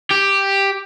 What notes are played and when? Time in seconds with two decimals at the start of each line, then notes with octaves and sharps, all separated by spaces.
0.11 G4